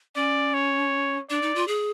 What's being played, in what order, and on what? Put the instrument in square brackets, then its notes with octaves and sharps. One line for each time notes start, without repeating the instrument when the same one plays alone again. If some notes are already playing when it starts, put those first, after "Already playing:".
[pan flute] C#4 [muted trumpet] D5
[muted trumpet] C#5
[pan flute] D4 [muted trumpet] D5
[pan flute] D#4
F4
G#4